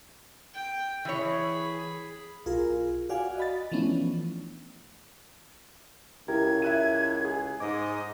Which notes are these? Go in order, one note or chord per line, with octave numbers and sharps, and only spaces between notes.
G5
E3 G#4 C#5 B5
B1 F4 G#4 A#4
F#4 D5 F5 F#5 G#5
D#5 B5 A6
E3 F3 A3 B3 C#4 D4
C#2 E4 G4 A#4 G#6
E5 F#6 D#7
G#4
G#2 D#5 D6